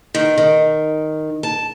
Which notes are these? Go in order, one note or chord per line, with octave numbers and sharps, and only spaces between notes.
D#3
D#3
A5